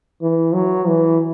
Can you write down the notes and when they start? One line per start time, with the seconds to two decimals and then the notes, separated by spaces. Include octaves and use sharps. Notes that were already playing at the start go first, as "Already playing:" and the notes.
0.22 E3
0.54 F#3
0.87 E3